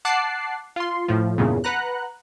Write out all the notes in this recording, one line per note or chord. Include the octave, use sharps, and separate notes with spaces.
F#5 A5 D6 F#6 C7
F4 C6
A2 F3
E2 G2 A#2 C#3
B4 F#5 A#5 F#6